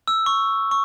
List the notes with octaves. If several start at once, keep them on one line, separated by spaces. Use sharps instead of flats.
E6
C#6
C#6